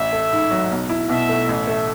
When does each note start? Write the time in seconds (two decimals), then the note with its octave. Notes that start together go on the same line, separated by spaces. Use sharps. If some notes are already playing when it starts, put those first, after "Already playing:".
Already playing: A1 E5
0.12 A3
0.32 G#2
0.51 F#3
0.70 B1
0.89 E4
1.09 B2 E5
1.29 A3
1.48 A1 E5
1.67 A3